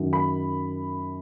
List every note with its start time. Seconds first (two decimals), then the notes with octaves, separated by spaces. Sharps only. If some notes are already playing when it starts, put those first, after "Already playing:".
Already playing: F#2 D#3 F#3
0.13 B5